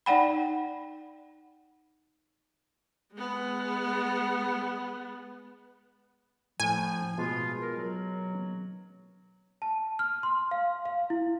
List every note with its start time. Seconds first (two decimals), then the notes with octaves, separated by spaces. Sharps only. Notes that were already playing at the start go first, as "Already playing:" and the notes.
0.06 D#4 D5 F#5 G5 B5
3.13 G#3 B3
6.60 A2 F3 G#5
7.18 B2 G#3 F4
7.60 A#4
7.77 F#3
9.62 A5
9.99 F6
10.23 C6
10.51 F5
10.85 F5
11.10 E4